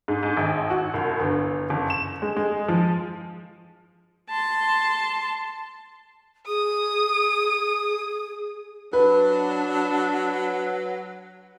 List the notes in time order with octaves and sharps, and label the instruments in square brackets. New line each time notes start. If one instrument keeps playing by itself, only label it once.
[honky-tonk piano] G#2
G#2
G#1
F#4
C2
G1
F#1
E7
G#3
G#3
F3
[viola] A5 C6
[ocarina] G#4 [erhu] D#6
[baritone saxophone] F#3 [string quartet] D4 [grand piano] B4